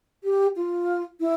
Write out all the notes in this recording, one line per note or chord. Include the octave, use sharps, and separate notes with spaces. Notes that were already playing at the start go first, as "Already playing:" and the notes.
G4
F4
E4